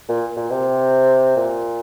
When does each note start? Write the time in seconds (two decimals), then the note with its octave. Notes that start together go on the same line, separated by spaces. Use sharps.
0.09 A#2
0.37 A#2
0.51 C3
1.36 A#2